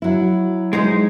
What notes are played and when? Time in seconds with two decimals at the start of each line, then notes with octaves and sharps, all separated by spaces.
0.02 F#3 E4
0.73 G#3 D#4 C5